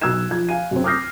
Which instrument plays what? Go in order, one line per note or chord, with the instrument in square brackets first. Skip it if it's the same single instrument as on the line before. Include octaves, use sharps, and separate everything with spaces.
[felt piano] B1 E6 F#6 G#6 E7
F3 G#6
F5 G#5 D#7
F#2 C4
D6 D#6 F6 G6 A#6 C7